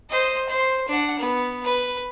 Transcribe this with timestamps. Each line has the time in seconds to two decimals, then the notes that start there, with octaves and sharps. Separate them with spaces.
0.10 C5 D#5
0.49 C5 C6
0.89 D4 F#5
1.19 B3
1.64 B4